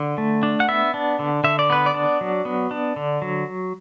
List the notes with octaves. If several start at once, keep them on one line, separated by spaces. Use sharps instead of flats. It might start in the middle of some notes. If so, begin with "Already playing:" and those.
Already playing: D3
A3
D4
F#5
B3 E5
D4
D3
D3 E5
D5
B3 B4
D5
D4
F#3
B3
D4
D3
F#3